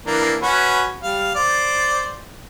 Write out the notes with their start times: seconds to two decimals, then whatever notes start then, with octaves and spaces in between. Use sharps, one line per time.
0.06 E3 A#3 D4
0.42 C#4 F#4 B4
1.03 G3 F5
1.35 C5 D5